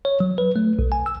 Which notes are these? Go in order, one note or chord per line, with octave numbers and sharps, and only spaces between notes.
C#5
F#3
B4
A3
B1
G#5
E6